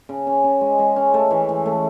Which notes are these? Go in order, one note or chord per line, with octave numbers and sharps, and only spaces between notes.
C#3
C#4
C#3
G#3
G#3
C#4
A3
E3
E3
A3